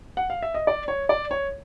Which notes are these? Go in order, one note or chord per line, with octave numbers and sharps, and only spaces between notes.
F#5
F5
E5
D#5
D5
C#5
D5
C#5